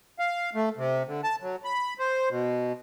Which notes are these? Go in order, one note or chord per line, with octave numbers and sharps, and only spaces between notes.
F5
A3
C3
D3
A5
F#3
B5
C5
B2